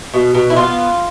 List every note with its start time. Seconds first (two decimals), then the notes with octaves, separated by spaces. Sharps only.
0.14 B2
0.34 B2
0.50 E4
0.56 B3 F4